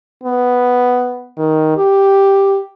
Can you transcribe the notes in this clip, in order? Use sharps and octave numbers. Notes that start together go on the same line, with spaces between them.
B3
D#3
G4